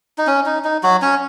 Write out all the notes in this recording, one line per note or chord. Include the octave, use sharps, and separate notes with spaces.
D#4
C#4
D#4
D#4
F#3 F#4
C#4 C#5